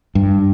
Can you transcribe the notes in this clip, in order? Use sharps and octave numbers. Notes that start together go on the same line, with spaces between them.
G2